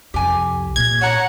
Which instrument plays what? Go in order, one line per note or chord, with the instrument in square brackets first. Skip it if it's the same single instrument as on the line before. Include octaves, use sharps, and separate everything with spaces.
[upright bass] C2 F2 [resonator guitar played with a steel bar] G4 G#5
[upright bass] A#2 [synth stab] G#6
[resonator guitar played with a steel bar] C#5 A#5 [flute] F#5